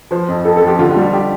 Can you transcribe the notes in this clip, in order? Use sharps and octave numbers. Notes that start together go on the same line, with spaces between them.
F3 C5
F2
F2 A4
A4
F3
G4
D3 F4
F4
G3
F4
G4